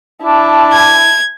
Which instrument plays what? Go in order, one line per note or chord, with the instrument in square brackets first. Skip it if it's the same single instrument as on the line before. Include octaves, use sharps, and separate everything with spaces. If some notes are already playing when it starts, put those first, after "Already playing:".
[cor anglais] D4 [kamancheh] E4 A5
[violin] G#6